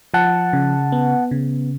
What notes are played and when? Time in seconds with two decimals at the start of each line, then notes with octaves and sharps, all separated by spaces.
0.14 F3 F#5 A5
0.53 C#3
0.92 B3
1.31 C#3